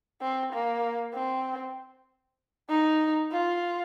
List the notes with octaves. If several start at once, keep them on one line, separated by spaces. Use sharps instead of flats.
C4
A#3
C4
D#4
F4